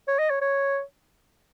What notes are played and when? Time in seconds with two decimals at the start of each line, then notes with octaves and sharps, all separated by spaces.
0.08 C#5
0.19 D#5
0.30 C#5
0.41 C#5